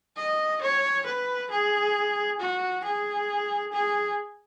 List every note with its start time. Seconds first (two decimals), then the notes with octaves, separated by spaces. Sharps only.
0.17 D#5
0.62 C#5
1.06 B4
1.50 G#4
2.40 F#4
2.84 G#4
3.73 G#4